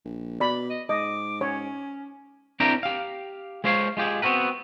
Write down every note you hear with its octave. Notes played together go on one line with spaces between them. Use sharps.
A#1
B2 D5 B5
D#5
G#2 D#5 D6
C#4 C#5
C4 D4 E4 G4 A#4 A#5
G4 F5
G#3 F4 C5 C#5 F5
G#3 F4 G4 G#4
B3 C4 F#4 A#4 B4